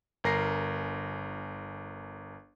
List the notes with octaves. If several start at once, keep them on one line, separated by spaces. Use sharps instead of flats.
G1 A#4 A#6 C7